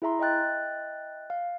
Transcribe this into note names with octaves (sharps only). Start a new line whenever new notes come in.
E4 G#4 E5 A#5 C6
D#5 E5 G5 F#6 A6
F5